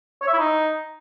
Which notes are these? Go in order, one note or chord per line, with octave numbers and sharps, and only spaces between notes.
C#5
E5
E4
D#4